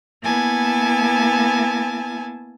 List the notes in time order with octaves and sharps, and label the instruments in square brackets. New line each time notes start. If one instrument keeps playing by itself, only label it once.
[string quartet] A#3 B3 E4 G#5 A5